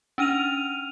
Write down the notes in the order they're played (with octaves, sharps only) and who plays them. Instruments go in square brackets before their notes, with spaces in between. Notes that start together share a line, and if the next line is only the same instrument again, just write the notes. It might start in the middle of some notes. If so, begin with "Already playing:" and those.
[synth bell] C#4 D4 F6 D#7 F7